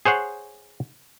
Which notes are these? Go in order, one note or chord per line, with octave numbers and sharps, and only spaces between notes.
G#4 C5 C#5 F#5